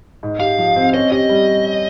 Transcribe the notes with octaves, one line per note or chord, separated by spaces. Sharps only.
G#2
G4 F5
F3
C4
C#4 D#5
G4 D#5
G3
G3